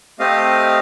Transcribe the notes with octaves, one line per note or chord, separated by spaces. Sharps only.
A3 C4 G4 D#5 F5